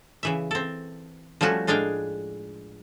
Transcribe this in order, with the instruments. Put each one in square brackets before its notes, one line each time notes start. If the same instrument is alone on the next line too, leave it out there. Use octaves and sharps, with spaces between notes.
[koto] C#3 E3 E5
C4 A4
F3 G3 A3 C#4 F#4
A2 G#3 D4 G#4 F5 G5